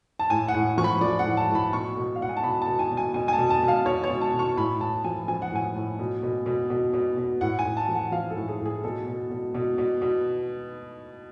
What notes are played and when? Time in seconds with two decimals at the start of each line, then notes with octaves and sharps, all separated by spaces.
0.19 A5
0.30 A2 G#5
0.48 F#5
0.54 A2
0.78 F3 C#6
0.84 B5
1.01 F3 D5
1.19 F#5
1.25 A2
1.37 A5
1.49 A2
1.55 B5
1.73 B2 C#6
1.97 B2
2.16 F5
2.20 B2 F#5
2.29 G#5
2.37 A5
2.44 B2 B5
2.62 A5
2.67 B2
2.79 G#5
2.91 B2
2.97 G#5
3.14 B2 G#5
3.28 G#5
3.33 A5
3.38 B2
3.50 A5
3.62 B2
3.68 F5
3.86 B2 C#5
4.04 C#5
4.09 B2
4.21 A5
4.33 B2
4.39 C#6
4.57 A2 B5
4.81 A2 A5
5.04 F3 G#5
5.28 F3 G#5
5.42 F#5
5.52 A2 G#5
5.75 A2
5.99 B2
6.23 B2
6.46 B2
6.70 B2
6.94 B2
7.17 B2
7.41 A2 F#5
7.59 G#5
7.65 A2
7.77 A5
7.88 F3
7.95 F#5
8.12 F3 F5
8.30 A4
8.36 A2
8.48 G#4
8.60 A2
8.66 G#4
8.84 B2 A4
9.07 B2
9.31 B2
9.54 B2
9.78 B2
10.02 B2